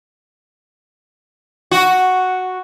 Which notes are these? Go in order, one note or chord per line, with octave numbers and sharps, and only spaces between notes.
F#4